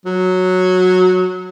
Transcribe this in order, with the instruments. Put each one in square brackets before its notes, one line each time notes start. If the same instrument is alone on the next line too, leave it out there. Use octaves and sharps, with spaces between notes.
[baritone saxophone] F#3